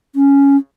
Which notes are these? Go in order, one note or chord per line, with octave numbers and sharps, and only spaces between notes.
C#4